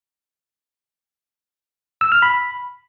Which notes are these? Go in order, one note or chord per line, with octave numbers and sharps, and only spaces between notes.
E6
F6
B5